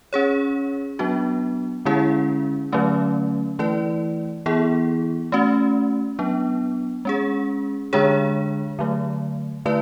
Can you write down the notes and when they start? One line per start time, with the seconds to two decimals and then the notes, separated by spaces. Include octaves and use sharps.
0.13 C#4 G#4 C#5
0.99 F#3 B3 D4 F#4
1.85 D3 G#3 C#4 E4 G#4
2.72 D3 F#3 A3 C#4
3.59 E3 A3 E4 B4 D5
4.46 E3 B3 E4 G#4
5.32 A3 C#4 F#4
6.19 F#3 B3 D4
7.05 G#3 C#4 G#4
7.93 D3 G#3 D4 G#4 C#5
8.79 D3 F#3 A3
9.65 D3 A3 E4 B4 D5